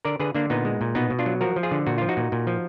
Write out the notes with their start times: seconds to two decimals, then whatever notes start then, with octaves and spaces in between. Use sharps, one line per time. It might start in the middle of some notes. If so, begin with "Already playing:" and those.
0.05 D3 A#4 D5
0.20 D3 G#4 B4
0.35 D3 A#3 D4
0.50 A#2 B3 D#4
0.65 G#3
0.81 A#2
0.95 B2 B3 D#4
1.10 B2
1.19 D4 F4
1.26 F#3
1.41 F3 F#4 A#4
1.56 F3
1.63 F4 G#4
1.71 D3
1.86 A#2 F#4
1.98 F3 F4
2.09 D#4 F#4
2.17 A#2
2.32 A#2
2.47 F3